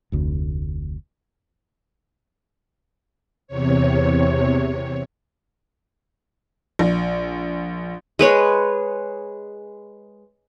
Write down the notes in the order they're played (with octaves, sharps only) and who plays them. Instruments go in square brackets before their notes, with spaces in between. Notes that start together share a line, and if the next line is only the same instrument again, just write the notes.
[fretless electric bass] F1 D2
[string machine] E2 C3 C#5
[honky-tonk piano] A#1
[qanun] G#3 B4 C#5